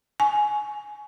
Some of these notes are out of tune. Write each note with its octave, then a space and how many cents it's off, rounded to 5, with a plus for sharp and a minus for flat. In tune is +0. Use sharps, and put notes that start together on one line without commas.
G#5 +15 C#6 +25